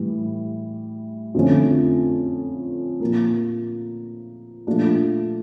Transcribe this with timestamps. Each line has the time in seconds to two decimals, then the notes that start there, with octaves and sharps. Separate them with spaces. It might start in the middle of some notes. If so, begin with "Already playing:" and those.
Already playing: A2 E3 G3
1.34 F2 D3 F3 A3 C#4
3.00 A#2 F3 A#3
4.67 A#2 F3 A3 D4